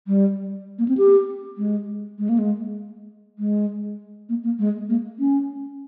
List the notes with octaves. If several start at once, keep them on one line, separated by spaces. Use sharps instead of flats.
G3
A#3
C4
G4
G#3
G#3
A#3
G#3
G#3
A#3
A#3
G#3
A#3
C#4